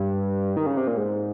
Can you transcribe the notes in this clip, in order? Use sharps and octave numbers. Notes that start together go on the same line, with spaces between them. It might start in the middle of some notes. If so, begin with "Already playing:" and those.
Already playing: G2
D#3
C#3
C3
A#2
G#2